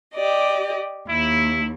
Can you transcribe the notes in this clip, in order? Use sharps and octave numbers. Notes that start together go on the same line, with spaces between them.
G4 D5 D#5
D#2 E4